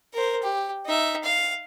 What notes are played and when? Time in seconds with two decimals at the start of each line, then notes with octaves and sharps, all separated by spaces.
0.13 A#4 C5
0.42 G4
0.86 D#4 E5
1.24 F5